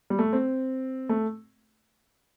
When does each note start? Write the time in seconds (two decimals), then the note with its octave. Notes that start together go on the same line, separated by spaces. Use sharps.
0.10 G3
0.19 A3
0.33 C4
1.09 A3